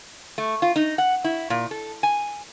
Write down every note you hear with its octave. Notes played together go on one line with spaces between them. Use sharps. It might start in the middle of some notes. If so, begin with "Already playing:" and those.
A3
F4
D#4
F#5
E4
A#2
A4
G#5